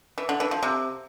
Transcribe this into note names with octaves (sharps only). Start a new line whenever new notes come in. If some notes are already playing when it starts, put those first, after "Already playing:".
E3
D3
E3
F3
C3